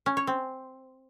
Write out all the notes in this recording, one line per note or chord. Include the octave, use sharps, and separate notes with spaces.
C#4
C#5
C4